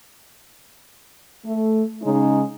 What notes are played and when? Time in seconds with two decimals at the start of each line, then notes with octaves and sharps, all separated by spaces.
1.45 A3
2.03 C#3 G#3 C#4 D#4